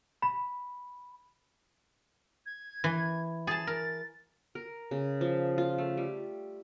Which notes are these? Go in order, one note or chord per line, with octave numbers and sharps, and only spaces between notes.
B5
G#6
E3
G#4 A5 A6
A#4
A#4
C#3
F3
F4
A3
G3